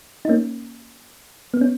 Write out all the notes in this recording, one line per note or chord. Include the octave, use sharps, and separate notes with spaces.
D#4
A#3 C#4
B3
C#4